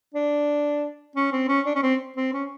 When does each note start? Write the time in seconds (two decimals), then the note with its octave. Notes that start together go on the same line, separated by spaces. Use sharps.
0.14 D4
1.15 C#4
1.32 C4
1.48 C#4
1.66 D4
1.75 C#4
1.83 C4
2.16 C4
2.33 C#4